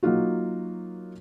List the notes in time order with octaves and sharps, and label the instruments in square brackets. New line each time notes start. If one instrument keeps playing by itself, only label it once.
[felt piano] F#3 A#3 D#4 F4 F#4